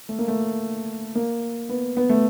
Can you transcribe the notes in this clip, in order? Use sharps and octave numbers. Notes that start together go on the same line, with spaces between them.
A3
A#3
A3
A#3
B3
B3
A3